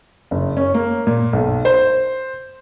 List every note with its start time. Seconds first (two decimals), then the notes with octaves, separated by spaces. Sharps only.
0.31 F#1
0.57 C#4
0.74 A#3
1.07 A#2
1.33 B1
1.65 C5